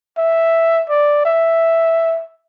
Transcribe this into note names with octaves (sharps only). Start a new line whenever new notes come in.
E5
D5
E5